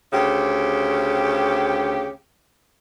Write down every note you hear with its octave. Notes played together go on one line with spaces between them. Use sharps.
D2 C#3 G4